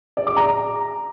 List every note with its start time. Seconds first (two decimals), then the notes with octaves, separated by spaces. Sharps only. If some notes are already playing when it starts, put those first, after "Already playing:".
0.17 D5
0.27 D6
0.37 A#5